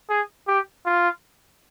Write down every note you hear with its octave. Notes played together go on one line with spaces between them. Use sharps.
G#4
G4
F4